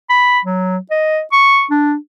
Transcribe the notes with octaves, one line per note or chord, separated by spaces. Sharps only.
B5
F#3
D#5
C#6
D4